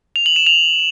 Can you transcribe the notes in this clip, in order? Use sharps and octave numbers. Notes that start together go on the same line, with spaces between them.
F7
F#7
E7
F7